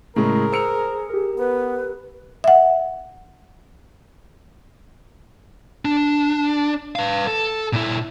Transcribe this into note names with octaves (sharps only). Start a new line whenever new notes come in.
A2 C#3 G#3 A3 G#4 A#4
C5 E6 C#7 F7
G4 A#4
B3 B4
E5 F#5
D4
B4 F5
A4
A#2 E4